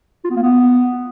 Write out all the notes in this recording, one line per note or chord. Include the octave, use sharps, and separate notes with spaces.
F4
B3
A#3
B3